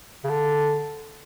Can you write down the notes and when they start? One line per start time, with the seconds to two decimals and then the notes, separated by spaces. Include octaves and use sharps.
0.24 C#3
0.29 D3